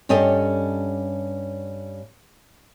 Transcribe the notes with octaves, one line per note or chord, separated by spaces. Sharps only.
G2 C#4 G4 A4 D#5